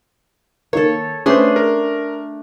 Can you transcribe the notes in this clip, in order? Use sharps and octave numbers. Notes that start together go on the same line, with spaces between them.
D#3 A#3 A4 C#5
A3 C#4 D4 G#4 B4 C5 C6
A#4